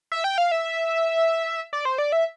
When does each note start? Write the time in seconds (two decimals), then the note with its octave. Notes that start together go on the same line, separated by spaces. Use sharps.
0.12 E5
0.24 G5
0.38 F5
0.52 E5
1.73 D5
1.85 C5
1.98 D5
2.12 E5